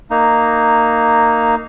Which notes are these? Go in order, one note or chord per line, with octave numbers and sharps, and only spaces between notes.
A#3 D#4